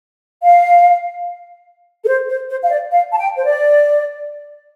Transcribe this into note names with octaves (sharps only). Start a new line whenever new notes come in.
F5
A4
C5
C5
C5
F5
D5
F5
A5
G5
C5
D5